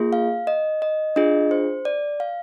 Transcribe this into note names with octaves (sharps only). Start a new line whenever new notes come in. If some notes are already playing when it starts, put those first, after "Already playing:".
Already playing: A#3 F4 G#4
F5
D#5
D#5
D4 F4 G#4 D#5
C5
D5
F5